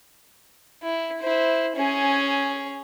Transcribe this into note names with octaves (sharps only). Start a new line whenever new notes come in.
E4
E4 C5
C#4 G#4